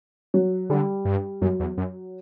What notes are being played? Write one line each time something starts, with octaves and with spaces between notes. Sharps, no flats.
F#3
D3 G3
G2
F#2 F#3
E2
F#2